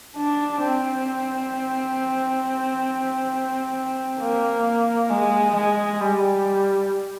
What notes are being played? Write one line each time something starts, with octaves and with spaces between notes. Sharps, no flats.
D4
C4
A#3
G#3
G#3
G3